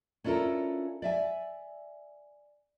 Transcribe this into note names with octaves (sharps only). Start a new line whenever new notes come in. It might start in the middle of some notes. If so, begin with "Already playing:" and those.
C#4 D4 E4 F4 A4 A#4
D5 E5 G#5